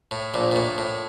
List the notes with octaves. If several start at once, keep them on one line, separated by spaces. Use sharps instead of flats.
A2
A#1 A#2
A#2
A2
A2